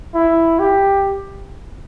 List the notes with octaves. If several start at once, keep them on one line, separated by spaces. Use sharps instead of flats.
E4
G4